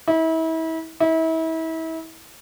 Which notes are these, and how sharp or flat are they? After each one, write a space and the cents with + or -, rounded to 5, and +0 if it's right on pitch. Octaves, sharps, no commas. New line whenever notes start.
E4 -35
E4 -35